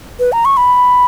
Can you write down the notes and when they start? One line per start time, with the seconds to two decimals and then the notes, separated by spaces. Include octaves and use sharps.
0.19 B4
0.32 A#5
0.45 C#6
0.57 B5